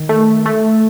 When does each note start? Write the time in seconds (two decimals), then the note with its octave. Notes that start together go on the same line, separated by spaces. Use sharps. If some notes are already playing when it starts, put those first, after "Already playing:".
Already playing: D#3
0.09 A3
0.46 A3